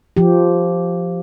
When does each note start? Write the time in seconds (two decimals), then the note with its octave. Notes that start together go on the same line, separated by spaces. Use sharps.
0.17 F3 G4